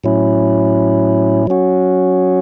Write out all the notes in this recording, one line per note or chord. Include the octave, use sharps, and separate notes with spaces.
A2 F#3 C#4 E4
F#3 C#4 F#4